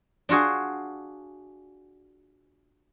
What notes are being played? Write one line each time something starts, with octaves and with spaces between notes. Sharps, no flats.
D4 F4 F#4 G#4